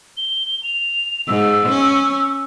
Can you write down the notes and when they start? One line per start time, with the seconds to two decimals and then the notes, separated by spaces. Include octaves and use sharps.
0.17 G7
0.63 F7
1.28 G#2 E6
1.69 C#4